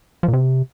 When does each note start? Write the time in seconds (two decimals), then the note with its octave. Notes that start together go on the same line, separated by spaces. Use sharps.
0.23 F3
0.28 A#2
0.33 C3